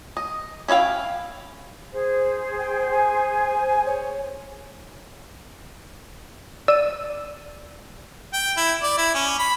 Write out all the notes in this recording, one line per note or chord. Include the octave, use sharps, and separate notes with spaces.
D#5
C#4 E4 A4 F5 G5
G#4 C5
G5
G#5
C#5
D5 E6 D#7
G5
E4
D5
E4
C#4
B5